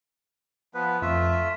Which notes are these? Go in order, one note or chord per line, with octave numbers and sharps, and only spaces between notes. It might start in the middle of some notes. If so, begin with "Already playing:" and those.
F3 B3 B4
F2 A3 F4 E5